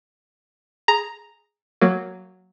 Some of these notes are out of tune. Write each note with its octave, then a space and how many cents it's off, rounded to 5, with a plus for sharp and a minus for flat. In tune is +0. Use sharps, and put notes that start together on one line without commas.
G#4 +0 A#5 +0
F#3 +0 A#3 -15